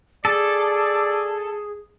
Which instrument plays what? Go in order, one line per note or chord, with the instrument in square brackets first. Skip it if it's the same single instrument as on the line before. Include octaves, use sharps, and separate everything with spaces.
[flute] G#4 [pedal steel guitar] A4 [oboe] D5